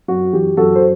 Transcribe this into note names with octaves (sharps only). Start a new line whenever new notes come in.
F#2 F#4
E3 G4
F#2 F#4 A4
C5